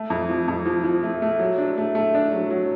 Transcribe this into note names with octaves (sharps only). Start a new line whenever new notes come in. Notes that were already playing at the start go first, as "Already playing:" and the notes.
Already playing: A3
F2
F3
F2
F3
F3
A3
A3
F#3
D4
A3
A3
D4
F#3
F#3